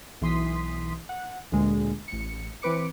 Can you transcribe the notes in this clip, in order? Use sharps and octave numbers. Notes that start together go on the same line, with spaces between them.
B1 E3 C6 D#6 B6
F#5
D2 A#2 D3 G#3
A1 C#7
E3 C4 B4 D6 C#7